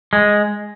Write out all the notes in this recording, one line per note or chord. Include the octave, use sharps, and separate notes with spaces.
G#3